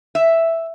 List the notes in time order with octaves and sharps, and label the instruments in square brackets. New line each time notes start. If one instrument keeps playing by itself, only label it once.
[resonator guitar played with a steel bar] E5